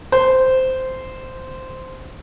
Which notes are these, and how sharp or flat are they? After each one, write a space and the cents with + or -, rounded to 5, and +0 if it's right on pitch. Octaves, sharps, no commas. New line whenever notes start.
C5 -10